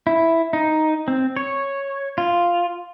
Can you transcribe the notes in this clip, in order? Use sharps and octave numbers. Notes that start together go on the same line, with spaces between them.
E4
D#4
C4
C#5
F4